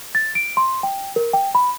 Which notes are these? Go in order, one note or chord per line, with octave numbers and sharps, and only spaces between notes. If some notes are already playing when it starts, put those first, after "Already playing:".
A6
D7
C6
G5
A#4
G5
B5